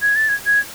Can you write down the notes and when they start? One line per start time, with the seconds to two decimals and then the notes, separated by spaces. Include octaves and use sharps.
0.02 G#6
0.16 A6
0.29 G#6
0.46 G#6